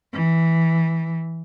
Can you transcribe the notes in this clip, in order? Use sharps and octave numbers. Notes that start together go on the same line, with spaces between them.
E3